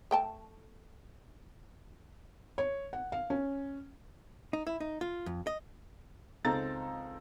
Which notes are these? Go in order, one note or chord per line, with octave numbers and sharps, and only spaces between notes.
A3 G5 A5
C#5
F#5
F5
C#4
D#4
E4
D#4
F4
F2
D#5
C#2 C4 D#4 A4 A#5 A6